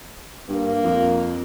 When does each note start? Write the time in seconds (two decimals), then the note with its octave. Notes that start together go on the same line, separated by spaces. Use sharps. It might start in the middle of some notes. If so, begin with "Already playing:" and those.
0.49 G2 A#3
0.84 F2